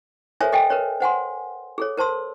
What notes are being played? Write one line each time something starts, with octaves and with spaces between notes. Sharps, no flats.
A4 A#4 C5 C#5 E5 G#5
A4 D#5 G5 G#5
A#4 B4 C#5
C5 F#5 G#5 C6
G#4 A4 C#5
A#4 C5 A5 C6 E6